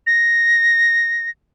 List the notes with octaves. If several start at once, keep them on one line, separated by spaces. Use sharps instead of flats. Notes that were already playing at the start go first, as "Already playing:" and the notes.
A#6